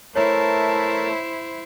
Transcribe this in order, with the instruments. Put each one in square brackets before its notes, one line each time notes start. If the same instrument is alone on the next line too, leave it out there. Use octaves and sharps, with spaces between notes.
[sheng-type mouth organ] A3 [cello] E4 C5 [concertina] A#4 A5 [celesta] C#5